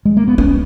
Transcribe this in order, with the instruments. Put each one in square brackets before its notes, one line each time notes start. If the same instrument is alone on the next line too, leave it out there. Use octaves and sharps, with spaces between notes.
[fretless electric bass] G#3
A#3
B3
[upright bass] B3 [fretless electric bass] C#4